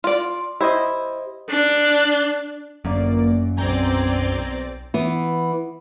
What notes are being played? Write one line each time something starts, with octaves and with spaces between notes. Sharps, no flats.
F4 D5
E4 G4 C5 D#5
D4
G1 F#2 A#3 D5
B1 C4 D5 G#5 A#5 G6
E3 B3